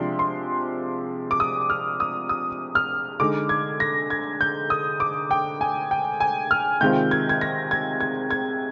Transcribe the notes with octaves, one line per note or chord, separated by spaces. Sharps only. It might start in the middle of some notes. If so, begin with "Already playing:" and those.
Already playing: C3 F3 G#3 D4 C6
C6
D6
D#6
F6
D#6
D#6
F6
D3 G#3 D#4 D6
G#6
A#6
G#6
G6
D#6
D6
G5
G#5
G5
G#5
F6
C3 D#3 G#3 C4 F4 G6
G#6
G#6
A#6
G#6
G#6
G#6